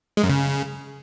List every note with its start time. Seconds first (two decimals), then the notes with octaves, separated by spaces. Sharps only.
0.17 G#3
0.23 F#2
0.30 C#3